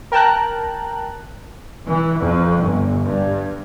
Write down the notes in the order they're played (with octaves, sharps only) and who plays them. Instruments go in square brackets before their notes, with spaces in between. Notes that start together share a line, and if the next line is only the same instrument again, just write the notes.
[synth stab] A#4 G5 A5 A#5 F#6
[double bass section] E3
F2
G1
G2